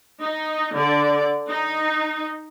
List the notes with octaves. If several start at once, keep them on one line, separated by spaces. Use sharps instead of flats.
D#4
D3 D5
D#4